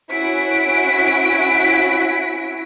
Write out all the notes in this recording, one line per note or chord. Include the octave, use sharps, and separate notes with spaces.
C#4 E4 F#4 B6 D7